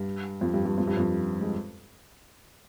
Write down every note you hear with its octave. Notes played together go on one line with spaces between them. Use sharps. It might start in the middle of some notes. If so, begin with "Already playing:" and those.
Already playing: G2
F2
G2
G2
F2
G2
F2
G#3